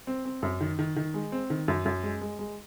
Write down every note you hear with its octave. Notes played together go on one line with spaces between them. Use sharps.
C4
C4
F#2
D#3
D#3
D#3
G#3
C4
D#3
F#2
F#2
G#3
G#3
G#3